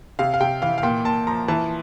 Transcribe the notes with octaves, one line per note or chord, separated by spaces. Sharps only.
C3 F5
F5
C3 G5
E3 F5
F5
A#2 G5
A#2 A5
F3 A#5
E3 A5